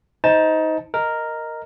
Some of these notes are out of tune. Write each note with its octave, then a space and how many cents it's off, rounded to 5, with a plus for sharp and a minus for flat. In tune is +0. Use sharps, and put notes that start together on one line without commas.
D#4 +20 C5 -15 A5 +0
A#4 +0 D#5 +0